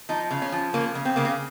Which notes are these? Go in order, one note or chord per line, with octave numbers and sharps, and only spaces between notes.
F3 D#4
C#3
C#4
F3
C#3 A#3
C#3
C4
C#3 A#3
C4